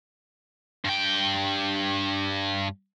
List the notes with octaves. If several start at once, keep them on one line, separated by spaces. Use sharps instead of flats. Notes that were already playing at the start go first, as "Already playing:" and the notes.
G2 G5